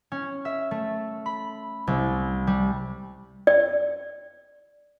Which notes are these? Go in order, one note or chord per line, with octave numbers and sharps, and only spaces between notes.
C#4
E5
A3
B5
C2
G3
D5